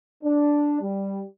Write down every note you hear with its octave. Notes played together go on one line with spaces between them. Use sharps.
D4
G3